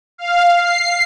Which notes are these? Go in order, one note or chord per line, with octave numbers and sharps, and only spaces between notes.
F5
C7